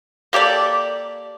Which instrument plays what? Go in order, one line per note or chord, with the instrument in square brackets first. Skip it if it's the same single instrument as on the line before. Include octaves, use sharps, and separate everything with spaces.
[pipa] A#3 G4 A4 D5